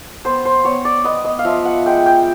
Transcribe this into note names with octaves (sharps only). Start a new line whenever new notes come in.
B3 C5
C5
B3 C#5
D5
B3 D#5
D#5
F5
F3 E5
F#5
G#3 G5
G5